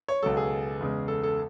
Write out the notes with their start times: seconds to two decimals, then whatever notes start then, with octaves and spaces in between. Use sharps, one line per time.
0.08 C#5
0.23 C#2 B2 F#3 A4
0.37 G#4
0.80 E2 C#3 G#3
1.08 A4
1.23 A4